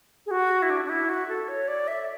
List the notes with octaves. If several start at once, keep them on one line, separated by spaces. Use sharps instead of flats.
G#4
F#4
E4
D4
D4
E4
F#4
A4
C#5
D5
E5